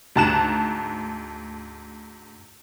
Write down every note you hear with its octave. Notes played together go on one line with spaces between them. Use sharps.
D2 G#2 A5 A#5 F#6 E7